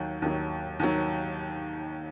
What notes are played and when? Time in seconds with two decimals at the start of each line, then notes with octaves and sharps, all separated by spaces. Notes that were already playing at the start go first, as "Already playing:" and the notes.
Already playing: D#2 D#3 F#3
0.22 D#2 D#3 F#3
0.80 D#2 D#3 F#3